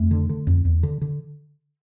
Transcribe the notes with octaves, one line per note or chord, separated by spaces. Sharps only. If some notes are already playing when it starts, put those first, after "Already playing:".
Already playing: F2 A3
D3
D3
F2
E2
D3
D3